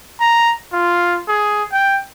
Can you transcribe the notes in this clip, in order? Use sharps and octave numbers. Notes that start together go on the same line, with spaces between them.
A#5
F4
G#4
G5